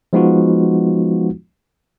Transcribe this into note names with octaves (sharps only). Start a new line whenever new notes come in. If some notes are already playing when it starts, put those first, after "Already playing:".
F3 G#3 B3 D#4 F4 F#4